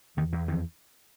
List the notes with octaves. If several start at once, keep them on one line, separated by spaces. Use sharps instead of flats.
E2 D#3
E2
F2 D#3